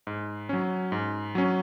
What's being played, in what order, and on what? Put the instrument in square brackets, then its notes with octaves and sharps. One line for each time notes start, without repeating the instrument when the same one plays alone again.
[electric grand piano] G#2
F#3 C#4
G#2
F#3 C#4